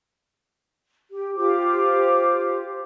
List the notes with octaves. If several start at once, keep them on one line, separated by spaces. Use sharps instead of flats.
G4
F4 G4 C5 D6